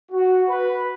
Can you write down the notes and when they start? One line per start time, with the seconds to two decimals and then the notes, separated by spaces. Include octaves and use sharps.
0.12 F#4
0.49 B4